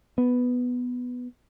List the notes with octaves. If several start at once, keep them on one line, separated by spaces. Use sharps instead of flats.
B3